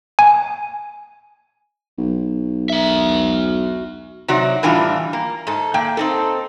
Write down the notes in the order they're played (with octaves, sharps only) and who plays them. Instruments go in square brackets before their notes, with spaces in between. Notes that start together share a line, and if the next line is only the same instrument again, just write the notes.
[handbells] G#5
[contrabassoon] B1
[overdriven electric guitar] F#4 E5
[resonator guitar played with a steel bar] C3 F#3 D#4 F#4 D5
A2 E3 G3 D4 D#4 F4
A#3
G#2 A4
A#2 A#3 G5
C4 D#4 A4